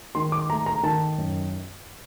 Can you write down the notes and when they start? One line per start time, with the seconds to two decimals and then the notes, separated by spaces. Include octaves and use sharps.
0.15 D#3 C6
0.32 D6
0.49 A3 A#5
0.66 A#5
0.83 D#3 A5
1.18 F#2